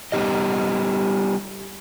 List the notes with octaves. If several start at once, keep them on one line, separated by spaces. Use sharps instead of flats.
G3 B3 D#4 G4 D#5